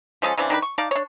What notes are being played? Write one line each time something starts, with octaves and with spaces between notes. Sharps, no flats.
F3 G#3 C#4 A4
C#3 E3 C4 D4
D#3 D4 G#4 B4
C#6
D#4 D5 F5 A5
D4 C#5